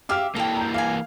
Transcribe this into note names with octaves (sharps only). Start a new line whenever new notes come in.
G4 E5 F5 D6 F6
E3 A#3 A4 G5
A#5 G6
D5 F5 G#5